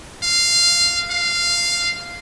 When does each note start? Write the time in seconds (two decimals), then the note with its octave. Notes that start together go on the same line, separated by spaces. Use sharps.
0.23 F5
1.10 F5